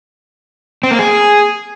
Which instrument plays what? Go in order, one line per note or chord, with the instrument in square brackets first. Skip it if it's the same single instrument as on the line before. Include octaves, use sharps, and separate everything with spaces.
[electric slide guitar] C4
A#3
G#4